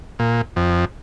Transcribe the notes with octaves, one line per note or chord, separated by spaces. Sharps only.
A#2
F2